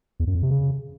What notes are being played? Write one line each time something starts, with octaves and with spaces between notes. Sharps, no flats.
E2
F#2
F2
C3
C#3